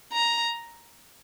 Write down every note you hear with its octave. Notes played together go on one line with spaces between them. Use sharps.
A#5